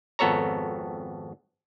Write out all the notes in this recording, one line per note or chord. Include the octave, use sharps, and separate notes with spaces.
G#1 F2 B3 A4 C#5 A#5